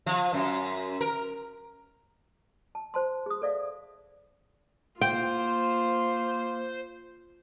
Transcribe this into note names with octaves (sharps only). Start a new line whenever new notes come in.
F3
F#2
A#4
A5
C5 A5 C6
G#4 D#6
A4 D5 E5 F5
A#3 F4 C5 G5